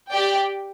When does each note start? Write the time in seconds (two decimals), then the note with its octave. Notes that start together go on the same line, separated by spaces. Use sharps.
0.11 G4 D5 G5